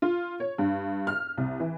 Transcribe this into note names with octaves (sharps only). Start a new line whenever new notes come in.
F4
C#5
G2
F6
C2
E3